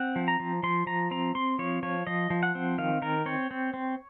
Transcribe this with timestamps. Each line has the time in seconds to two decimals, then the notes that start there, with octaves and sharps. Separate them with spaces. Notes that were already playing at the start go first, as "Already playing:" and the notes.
Already playing: C4 F#5
0.16 F3
0.28 A#5
0.40 F3
0.63 F3 C6
0.87 F3 A#5
1.11 C4 A#5
1.35 C4 C6
1.59 F3 C#5
1.83 F3 C#5
2.07 F3 D#5
2.30 F3
2.43 F#5
2.55 C4
2.78 D#3 F5
3.02 D#3 A#4
3.26 C4 C#5
3.51 C4
3.74 C4